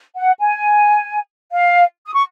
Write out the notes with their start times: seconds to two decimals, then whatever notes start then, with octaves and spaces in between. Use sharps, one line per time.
0.16 F#5
0.39 G#5
1.51 F5
2.06 D#6
2.14 C#6